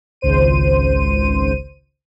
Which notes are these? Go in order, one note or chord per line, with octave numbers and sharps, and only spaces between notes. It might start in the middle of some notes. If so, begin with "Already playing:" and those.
G#1 C#2 C5 D#7